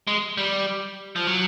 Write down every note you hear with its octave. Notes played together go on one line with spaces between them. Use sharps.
G#3
G3
F3
F#3